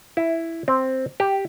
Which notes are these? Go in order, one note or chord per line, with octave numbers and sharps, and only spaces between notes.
E4
C4
G4